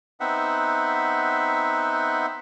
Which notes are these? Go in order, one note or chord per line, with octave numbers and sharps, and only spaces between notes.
B3 C4 D#4 E5 F#5